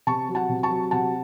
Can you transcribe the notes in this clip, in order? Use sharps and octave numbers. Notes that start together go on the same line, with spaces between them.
C3 A5 C#6
F#3
F#5 A5
C3
A5 C#6
F#3
C3 F#5 A5